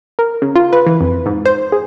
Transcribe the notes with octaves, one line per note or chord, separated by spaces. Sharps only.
A#4
C#3
F4
B4
E3
F2
G#2
C5
G#4